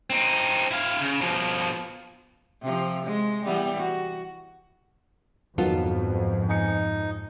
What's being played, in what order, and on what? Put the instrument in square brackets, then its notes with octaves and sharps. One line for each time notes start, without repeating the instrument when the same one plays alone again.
[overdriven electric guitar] C4 D#4
E4 F5
C#3
B2 F3
[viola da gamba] C3 F3
G#3
E3 G3 B3
F#4
[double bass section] F2 G#2 [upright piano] D#3 F#3 [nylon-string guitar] B3 F4 A4
[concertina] D#4 [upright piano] G#5 C#7